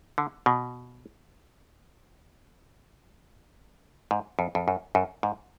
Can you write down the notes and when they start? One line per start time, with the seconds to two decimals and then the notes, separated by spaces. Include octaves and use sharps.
0.18 D3
0.46 B2
4.11 G#2
4.39 F2
4.55 F2
4.68 F#2
4.95 F#2
5.23 G#2